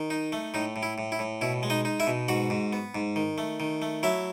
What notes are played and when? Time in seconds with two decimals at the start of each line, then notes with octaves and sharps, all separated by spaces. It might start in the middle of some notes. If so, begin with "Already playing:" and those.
Already playing: D#3
0.10 D#4
0.32 A3
0.54 A2 D#4
0.76 A2
0.83 E4
0.98 A2
1.12 E4
1.19 A2
1.41 B2 E4
1.63 G#3
1.70 D#4 D#5
1.85 D#4
2.00 E4 E5
2.07 B2
2.28 G#2 F#4 F#5
2.50 G#2
2.73 B3
2.95 G#2
3.16 D#3
3.38 A3
3.60 D#3
3.82 A3
4.03 F#3 E4 E5